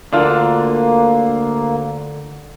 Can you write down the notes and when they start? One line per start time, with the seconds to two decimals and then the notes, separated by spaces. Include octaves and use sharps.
0.13 D2 D3 A#3 D4 F4 F6